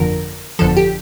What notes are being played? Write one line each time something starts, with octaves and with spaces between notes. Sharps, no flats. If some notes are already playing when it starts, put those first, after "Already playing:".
Already playing: G1 F2 D3 F3 A#4
G1 F2 D3 F3 A4
G4